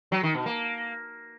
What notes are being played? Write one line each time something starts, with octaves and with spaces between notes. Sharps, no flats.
F#3
D#3
B2
A#3